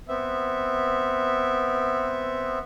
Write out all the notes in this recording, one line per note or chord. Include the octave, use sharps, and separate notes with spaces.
B3 C4 E5